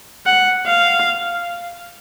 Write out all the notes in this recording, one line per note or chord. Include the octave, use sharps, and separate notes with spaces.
F#5
F5